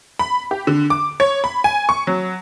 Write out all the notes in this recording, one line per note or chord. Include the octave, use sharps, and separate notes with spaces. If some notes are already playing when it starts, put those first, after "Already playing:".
B5
G4
D3
D6
C#5
B5
G#5
C#6
F#3